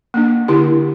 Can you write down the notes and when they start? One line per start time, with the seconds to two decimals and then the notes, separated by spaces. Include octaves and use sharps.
0.14 A#3 D4
0.48 D3 E4 G4